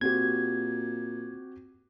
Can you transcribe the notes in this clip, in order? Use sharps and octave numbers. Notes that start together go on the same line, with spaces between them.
A#2 C4 F#4 G4 G#6